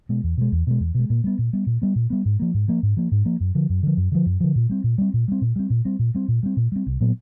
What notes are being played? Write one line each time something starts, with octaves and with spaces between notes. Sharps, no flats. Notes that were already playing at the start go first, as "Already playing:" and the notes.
B2 G#3
E2
B2 G#3
E2
B2 G#3
E2
B2 G#3
A#2
G3 B3
A#2
G3 B3
A#2
G3 B3
A#2
G3 B3
G#2
F3 A#3
G#2
F3 A#3
G#2
F3 A#3
G#2
F3 A#3
F#2
D3 F3
F#2
D3 F3
F#2
D3 F3
F#2
D3 F3
A#2
G3 C4
A#2
G3 C4
A#2
G3 C4
A#2
G3 C4
A#2
G3 C4
A#2
G3 C4
A#2
G3 C4
A#2
G3 C4
C2
A#2 F#3 B3